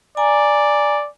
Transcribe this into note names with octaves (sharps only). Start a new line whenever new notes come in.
D5 G#5 A#5